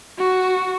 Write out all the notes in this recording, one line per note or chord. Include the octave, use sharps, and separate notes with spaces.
F#4